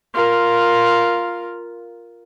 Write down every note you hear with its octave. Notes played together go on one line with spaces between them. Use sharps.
F4 A#4